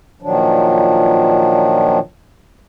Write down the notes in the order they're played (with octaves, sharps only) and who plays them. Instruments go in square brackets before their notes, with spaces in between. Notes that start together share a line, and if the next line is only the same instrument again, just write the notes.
[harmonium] A#2 D#3 F3 F#3 D4